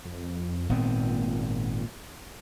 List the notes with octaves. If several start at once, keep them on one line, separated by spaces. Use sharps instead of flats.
F2
G#1 A#2 B3 C4